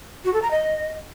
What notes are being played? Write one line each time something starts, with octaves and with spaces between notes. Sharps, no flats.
F#4
A4
A#5
D#5